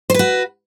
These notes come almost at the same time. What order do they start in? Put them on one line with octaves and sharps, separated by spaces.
C5 B4 F#4